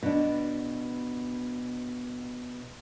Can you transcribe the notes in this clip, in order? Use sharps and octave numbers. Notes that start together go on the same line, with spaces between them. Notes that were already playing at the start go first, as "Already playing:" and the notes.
B2 D4